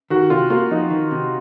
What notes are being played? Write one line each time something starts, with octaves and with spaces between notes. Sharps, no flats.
D#3 F#4
C3 F4
A#3 F4
F2 D#4
D#3
C3